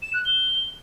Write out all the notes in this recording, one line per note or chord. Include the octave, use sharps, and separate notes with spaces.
E7
F#6
G7